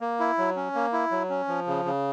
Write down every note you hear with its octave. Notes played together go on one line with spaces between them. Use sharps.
A#3
E4
F#3
C#4
A#3
E4
F#3
C#4
F3
C#3
C#3